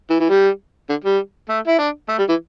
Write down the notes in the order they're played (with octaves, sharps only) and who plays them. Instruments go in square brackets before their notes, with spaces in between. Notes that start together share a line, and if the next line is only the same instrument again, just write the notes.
[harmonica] E3
E3
G3
D3
G3
A3
E4
D4
A3
G3
E3